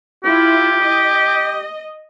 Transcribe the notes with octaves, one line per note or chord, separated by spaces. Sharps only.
E4 F4 G4
D#5